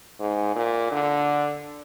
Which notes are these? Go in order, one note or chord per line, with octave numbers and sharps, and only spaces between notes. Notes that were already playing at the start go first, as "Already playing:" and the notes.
G#2
A#2
D3